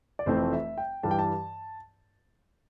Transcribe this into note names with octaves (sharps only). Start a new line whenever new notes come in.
D5
F1 F2 E3 A3 C4 C5
E5
G5
G2 E3 G3 A5
G5
A5